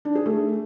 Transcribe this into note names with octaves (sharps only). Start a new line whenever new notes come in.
D4
G#4
A3